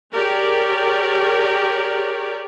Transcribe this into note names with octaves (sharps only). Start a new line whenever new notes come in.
G4 G#4 A#4 C#5 D5